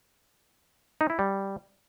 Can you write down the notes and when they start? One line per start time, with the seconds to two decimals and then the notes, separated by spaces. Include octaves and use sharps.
1.01 D#4
1.10 E4
1.19 G3